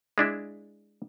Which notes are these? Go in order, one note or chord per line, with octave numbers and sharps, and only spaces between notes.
G#3 D4 E4